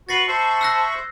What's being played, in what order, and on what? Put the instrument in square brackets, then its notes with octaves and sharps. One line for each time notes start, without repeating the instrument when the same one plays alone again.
[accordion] F#4 C#6 [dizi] B4 [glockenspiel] A6 A#6 C7
[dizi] C5 [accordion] E5 B5 C#6 [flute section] A5
[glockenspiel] E6 F#6 A#6